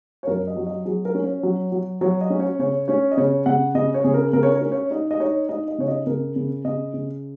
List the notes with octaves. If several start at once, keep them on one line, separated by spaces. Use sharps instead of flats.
C#5
F#2 A#4
D#5
F#3
D#5
F#3 G#4
A#4
C#4
C#5
F#3
F#3
F#3 C#5
D#5
C#4
C#5
C#3 C#5
C#4 C#5
D#5
C#3 C#5
C#3 F#5
C#3 D#5
C#5
C#3 G#4
A#4
C#3 A#4
C#5
A#4
C#4
C#5
D#4 D#5
D#5
D#4 C#5
D#4 D#5
D#5
C#3 C#5
D#5
C#3 A#4
C#3
C#3 D#5
C#3